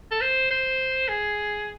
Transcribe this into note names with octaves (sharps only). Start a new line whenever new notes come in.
A4
C5
C5
G#4